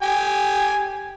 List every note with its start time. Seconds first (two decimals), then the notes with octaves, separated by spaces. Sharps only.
0.02 G4 G#5